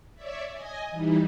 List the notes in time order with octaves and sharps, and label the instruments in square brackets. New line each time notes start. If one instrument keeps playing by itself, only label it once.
[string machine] C#5 D5 E5
D#5 G#5
E3 G3 D#4 E4